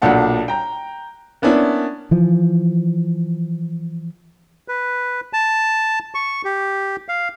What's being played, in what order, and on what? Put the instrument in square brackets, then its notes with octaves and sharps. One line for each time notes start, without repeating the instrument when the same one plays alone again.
[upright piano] B1 A#2 D4 F#5 A5
G5 A#5
A#3 B3 C#4 D4 E4
[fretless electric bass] E3 F3
[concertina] B4
A5
C#6
G4
F5